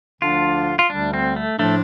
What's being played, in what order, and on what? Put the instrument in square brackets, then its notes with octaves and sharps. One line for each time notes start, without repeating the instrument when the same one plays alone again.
[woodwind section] D2 D3 F3 D4 [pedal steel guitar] F4
[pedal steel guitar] F4
[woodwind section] D2 D3 G3 [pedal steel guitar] D4
[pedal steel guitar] C4
A3
[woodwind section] A2 F3 D4 [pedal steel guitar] A3